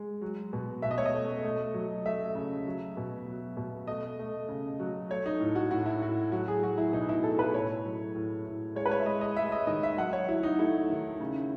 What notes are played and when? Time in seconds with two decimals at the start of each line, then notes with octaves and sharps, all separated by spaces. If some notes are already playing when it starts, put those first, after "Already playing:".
Already playing: G#3
0.21 F#3
0.53 B2
0.82 B2 E5
0.91 D#5
0.98 C#5
1.06 D#5
1.14 A3
1.45 A3
1.74 F#3
2.06 A3 E5
2.35 C#3
2.67 F#3
2.97 B2
3.26 F#3
3.57 B2
3.87 A3 D#5
4.19 A3
4.49 C#3
4.79 F#3
5.10 A3 C#5
5.26 D#4
5.40 A2
5.55 F#4
5.71 A2 F#4
5.86 E4
6.01 A2 F#4
6.32 F#3 F#4
6.48 G#4
6.62 F#3 F#4
6.78 E4
6.93 B2 D#4
7.09 E4
7.23 A3 A4
7.39 B4
7.54 A2 C#5
7.85 F#3
8.15 A2
8.46 A2
8.76 G#3 C#5
8.86 B4
8.91 C#5
9.00 E5
9.06 G#3 D#5
9.21 D#5
9.37 G#3 E5
9.52 D#5
9.67 D#3 D#5
9.83 E5
9.98 F#3 F#5
10.13 C#5
10.28 F#3 E4
10.43 D#4
10.59 A3 E4
10.90 D#3
11.20 C#3